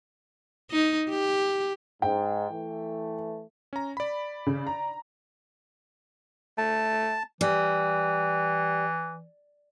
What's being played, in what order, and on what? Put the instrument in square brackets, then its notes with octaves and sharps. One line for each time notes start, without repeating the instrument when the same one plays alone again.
[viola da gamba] D#4
G4
[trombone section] G#2 [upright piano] G5
[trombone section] E3 A3
[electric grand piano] C#4 A#5
D5 B5
[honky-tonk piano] C#3
A#5
[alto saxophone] A3 [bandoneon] A5
[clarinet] E3 [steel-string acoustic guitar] G3